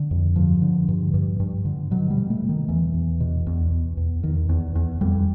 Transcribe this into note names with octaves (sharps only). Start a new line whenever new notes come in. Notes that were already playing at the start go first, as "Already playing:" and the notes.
Already playing: D3
F2
G2 F3
D3
G2
G2
G2
D3
B2 F#3
G3
B2
A3
B2
D#3
E2 E3
E2
B2
E2
E2
E2
E2 D#3
E2
E2
F2 G3